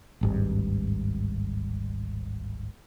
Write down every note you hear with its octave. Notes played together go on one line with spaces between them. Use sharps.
D1 G#1 G2